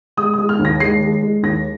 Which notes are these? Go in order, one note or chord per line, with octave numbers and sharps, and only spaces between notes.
G#3 D#6
D#6
G#3
F6
D#2
A#6
G#3 C7
G#3
G#3
D#2 A#6